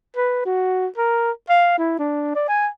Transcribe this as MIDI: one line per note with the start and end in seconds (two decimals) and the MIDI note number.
0.16 0.43 71
0.45 0.87 66
0.97 1.31 70
1.49 1.75 77
1.78 1.95 64
1.99 2.33 62
2.35 2.48 74
2.48 2.67 80